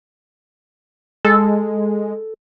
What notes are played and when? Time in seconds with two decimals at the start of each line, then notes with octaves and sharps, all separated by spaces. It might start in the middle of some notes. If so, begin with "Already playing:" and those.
1.25 G#3 A4